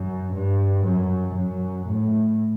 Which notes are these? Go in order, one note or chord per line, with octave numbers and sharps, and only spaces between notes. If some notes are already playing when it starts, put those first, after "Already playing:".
Already playing: F#2
G2
F#2
F#2
A2